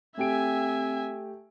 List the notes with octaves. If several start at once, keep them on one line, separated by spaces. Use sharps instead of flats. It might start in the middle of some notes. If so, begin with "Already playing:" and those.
A3 C4 G4 E5 G#5 D7